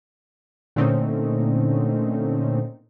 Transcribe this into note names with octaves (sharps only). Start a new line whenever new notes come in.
A#2 D3 A3 C4 C#4 D#4